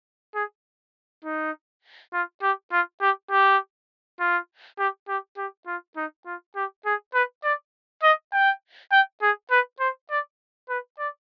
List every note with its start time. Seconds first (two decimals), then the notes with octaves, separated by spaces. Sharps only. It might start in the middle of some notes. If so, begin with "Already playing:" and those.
0.35 G#4
1.24 D#4
2.13 F4
2.42 G4
2.72 F4
3.01 G4
3.30 G4
4.20 F4
4.79 G4
5.08 G4
5.37 G4
5.67 F4
5.96 D#4
6.26 F4
6.56 G4
6.86 G#4
7.14 B4
7.44 D5
8.03 D#5
8.33 G5
8.92 G5
9.22 G#4
9.51 B4
9.80 C5
10.10 D5
10.69 B4
10.99 D5